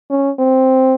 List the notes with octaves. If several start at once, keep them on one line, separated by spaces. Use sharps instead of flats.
C#4
C4